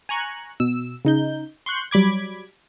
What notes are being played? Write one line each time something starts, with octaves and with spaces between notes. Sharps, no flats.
G#5 A#5 C#6 F#6
B2 E6
C#3 D#4 G6
C6 C#6 F#6 G6
F#3 G3 B5 D6 G#6